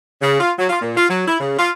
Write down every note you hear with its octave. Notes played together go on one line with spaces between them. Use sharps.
C#3
F4
F#3
F4
A#2
F4
F#3
E4
C#3
F4